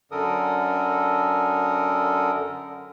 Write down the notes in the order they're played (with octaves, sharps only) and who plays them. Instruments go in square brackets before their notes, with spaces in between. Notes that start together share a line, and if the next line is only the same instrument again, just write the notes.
[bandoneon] F#2 D3 A4 A#4 D#6